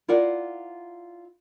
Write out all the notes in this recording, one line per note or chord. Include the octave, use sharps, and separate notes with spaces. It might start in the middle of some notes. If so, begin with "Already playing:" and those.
E4 F4 A#4 D5 F5 F#5